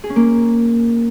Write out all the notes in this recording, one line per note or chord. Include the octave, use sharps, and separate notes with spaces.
G#4
C#4
A#3